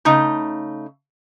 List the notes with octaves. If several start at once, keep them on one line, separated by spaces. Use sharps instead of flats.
C#3 A3 D#4